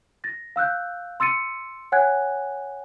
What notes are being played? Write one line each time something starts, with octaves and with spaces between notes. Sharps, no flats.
A6 A#6
F5 E6 F#6 G6
C6 E6 A6 C#7 D#7
C#5 F#5 G#5 F#6 G#6